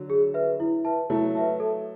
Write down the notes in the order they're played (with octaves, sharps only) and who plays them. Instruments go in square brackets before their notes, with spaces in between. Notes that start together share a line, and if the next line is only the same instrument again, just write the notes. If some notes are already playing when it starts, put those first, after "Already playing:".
Already playing: [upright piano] D3 F#3
[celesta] G#4
B4 E5
E4
B4 E5 A5
[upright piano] F#3 A3 [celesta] E4
[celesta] B4 E5 A5
A4